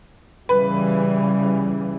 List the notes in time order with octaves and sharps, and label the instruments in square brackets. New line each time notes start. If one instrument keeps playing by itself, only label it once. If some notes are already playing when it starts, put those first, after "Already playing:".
[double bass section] C#3 E3 G3 [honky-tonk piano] B4